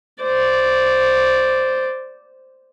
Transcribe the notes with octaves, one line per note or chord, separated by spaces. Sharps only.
C5 D5